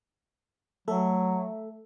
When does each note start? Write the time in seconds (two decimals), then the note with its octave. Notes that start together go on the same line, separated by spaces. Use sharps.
0.88 F#3 A3 A4 E5